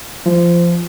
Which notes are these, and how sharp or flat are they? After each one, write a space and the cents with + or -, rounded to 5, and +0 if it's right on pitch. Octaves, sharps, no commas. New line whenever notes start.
F3 -20